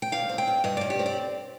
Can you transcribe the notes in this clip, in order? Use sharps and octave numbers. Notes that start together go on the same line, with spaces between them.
G5
G2 F5
C4
G5
G2
G2 D#5
G2 D5
G4
C4
D5